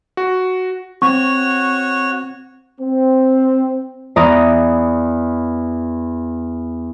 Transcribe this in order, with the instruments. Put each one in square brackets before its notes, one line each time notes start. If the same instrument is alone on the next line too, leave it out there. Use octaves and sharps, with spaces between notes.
[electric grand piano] F#4
[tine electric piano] C4 [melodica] F#4 C#5 [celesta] C#6
[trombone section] C4
[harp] E2 D5 A#5 D#6